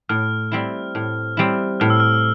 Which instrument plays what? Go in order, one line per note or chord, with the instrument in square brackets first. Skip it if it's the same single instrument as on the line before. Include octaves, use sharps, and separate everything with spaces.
[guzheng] A2 [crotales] F6
[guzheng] G3 C4 E4
A2
G3 C4 E4
[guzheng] A2 [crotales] F6
[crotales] E6
F6